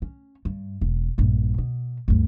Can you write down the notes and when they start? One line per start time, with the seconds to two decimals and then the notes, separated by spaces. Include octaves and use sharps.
0.02 C#4
0.45 G2
0.81 E1
1.18 A#1 G2
1.58 B2
2.08 D2 G2